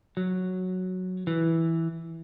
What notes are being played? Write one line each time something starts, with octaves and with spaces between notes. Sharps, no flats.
F#3
E3